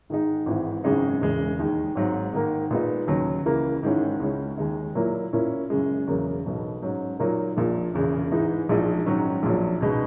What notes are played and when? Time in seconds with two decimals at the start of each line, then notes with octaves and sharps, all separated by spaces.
0.10 G#2 D#3 G#3 D#4
0.46 G#1 G#2 E3
0.84 G#1 F#2 C#3 G#3 D#4
1.21 E1 E2 C#3 G#3
1.59 D#2 D#3 G#3
1.95 G#1 G#2 F#3
2.33 G#2 D#3 A#3
2.71 A#2 G#3 B3 D#4
3.07 D#2 C#3 F#3
3.45 C#2 C#3 E3 A#3
3.83 G#2 D#3 G#3 C#4 E4
4.20 C#2 C#3 G#3 C#4
4.57 D#2 D#3 G#3 D#4
4.95 A#2 F#3 A#3 E4
5.33 A#2 A#3 C#4 E4
5.70 F#2 C#3 G#3
6.07 E1 E2 C#3 F#3 A#3
6.45 B1 B2 F#3
6.82 G#2 F#3 C#4
7.19 A#2 F#3 A#3 D#4
7.57 A#1 A#2 A#3
7.94 E1 E2 C#3
8.31 G#2 E3 G#3 D#4
8.69 A#1 A#2 G#3 D#4
9.06 G#2 D#3 F#3 C#4
9.43 A#1 A#2 F#3
9.80 C#2 B2 G#3 D#4